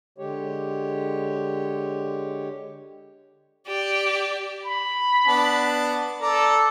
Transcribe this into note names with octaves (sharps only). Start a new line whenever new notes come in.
D3 G#3 G4 C#5
G4 D5
B5
B3 D4 A5
A4 D5 A#5